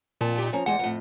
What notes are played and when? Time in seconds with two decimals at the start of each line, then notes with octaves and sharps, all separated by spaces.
0.21 F2 A#2 A#3 A5
0.38 D#4 G4
0.53 F3 C#4 A#5
0.66 E2 G3 G#3 F#5
0.79 F2 A2